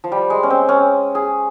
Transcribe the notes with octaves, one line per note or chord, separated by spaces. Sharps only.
F3
G3
G#3
C#4
C4
C#4
G#4